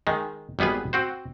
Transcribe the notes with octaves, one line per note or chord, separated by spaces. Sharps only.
D#3 G#3
G#1 G3 B3 G#4 B4
C4 F#4 C5